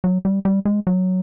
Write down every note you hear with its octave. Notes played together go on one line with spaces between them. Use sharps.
F#3
G3
G3
G#3
F#3